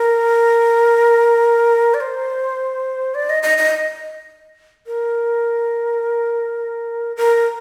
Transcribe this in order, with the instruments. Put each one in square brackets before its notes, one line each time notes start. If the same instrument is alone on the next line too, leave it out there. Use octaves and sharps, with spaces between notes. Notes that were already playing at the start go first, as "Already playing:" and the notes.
Already playing: [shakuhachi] A#4
D5
C5
D5
D#5
D#5
D#5
A#4
A#4